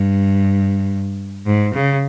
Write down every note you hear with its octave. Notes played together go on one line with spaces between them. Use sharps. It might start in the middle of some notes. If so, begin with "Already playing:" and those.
Already playing: G2
G#2
C#3